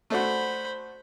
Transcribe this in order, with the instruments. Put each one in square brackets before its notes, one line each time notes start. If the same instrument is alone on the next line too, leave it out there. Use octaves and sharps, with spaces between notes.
[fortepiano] A3 D4 F#4 [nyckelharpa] C5 B5